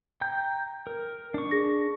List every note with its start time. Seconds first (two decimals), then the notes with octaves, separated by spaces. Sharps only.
0.21 G5 A#5 G6
0.87 A#4
1.34 D4 C#6
1.51 G#4 A#6